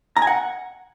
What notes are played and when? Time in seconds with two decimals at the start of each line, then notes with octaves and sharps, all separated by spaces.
0.17 A#5
0.22 G#5
0.27 F#5